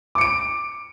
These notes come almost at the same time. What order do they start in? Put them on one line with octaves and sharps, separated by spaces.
D6 C#7 D7